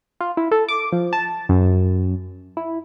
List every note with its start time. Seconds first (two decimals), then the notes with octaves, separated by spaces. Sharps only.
0.20 F4
0.37 E4
0.51 A4
0.69 D6
0.92 F3
1.13 A5
1.49 F#2
2.57 E4